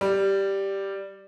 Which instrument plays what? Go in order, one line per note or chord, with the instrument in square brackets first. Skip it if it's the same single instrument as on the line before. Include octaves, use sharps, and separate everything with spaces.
[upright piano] G3